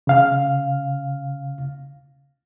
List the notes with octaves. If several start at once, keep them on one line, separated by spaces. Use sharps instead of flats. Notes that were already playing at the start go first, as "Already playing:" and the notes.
C#3 F5 F6